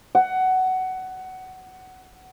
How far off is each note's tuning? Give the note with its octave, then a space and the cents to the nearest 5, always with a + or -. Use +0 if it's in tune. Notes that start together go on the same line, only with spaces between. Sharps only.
F#5 +15